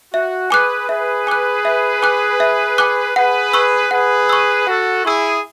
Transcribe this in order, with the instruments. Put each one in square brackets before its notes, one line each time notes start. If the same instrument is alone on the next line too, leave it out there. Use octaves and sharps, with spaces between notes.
[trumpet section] F#4 [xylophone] E5
[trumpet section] G#4 B4 [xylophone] G#5 D6 F#6
[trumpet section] G#4 B4 [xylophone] E5
[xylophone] G#5 D6 F#6
E5
G#5 D6 F#6
E5
G#5 D6 F#6
[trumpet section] G#4 B4 [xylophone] F#5
[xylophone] C#6 E6
[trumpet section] G#4 B4 [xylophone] F#5
[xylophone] C#6 E6
[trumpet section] F#4 A4 [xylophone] F#5
[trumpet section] E4 G#4 [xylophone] C#6 E6